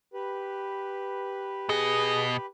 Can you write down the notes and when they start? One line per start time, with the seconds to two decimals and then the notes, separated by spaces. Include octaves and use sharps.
0.14 G4 B4
1.69 B2 G#4 D#5